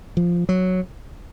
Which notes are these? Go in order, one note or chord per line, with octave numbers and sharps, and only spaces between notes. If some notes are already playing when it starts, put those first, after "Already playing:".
F3
F#3